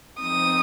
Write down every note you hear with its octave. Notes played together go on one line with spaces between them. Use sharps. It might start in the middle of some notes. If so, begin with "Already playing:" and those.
F3 C4 D#4 D#6